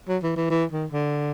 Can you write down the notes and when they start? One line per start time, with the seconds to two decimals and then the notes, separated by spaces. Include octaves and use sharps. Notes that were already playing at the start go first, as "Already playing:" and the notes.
0.08 F#3
0.23 E3
0.36 E3
0.50 E3
0.71 D#3
0.92 D3